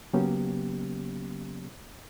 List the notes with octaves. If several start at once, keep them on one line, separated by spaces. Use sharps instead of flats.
C#3 F#3 A#3 B3 C#4 G4